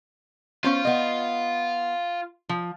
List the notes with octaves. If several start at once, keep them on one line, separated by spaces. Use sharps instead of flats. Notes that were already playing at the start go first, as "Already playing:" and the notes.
B3 C#4 F4 C5
B3 D#5
F3